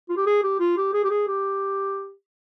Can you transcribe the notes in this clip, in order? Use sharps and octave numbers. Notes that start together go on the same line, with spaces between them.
F4
G4
G#4
G4
F4
G4
G#4
G4
G#4
G4